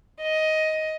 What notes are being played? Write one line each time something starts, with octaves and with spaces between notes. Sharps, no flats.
D#5